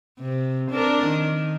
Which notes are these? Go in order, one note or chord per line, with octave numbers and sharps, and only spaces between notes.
C3
D4 A#4
D#3